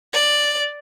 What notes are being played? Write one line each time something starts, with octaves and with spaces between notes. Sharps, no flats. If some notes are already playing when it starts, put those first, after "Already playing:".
D5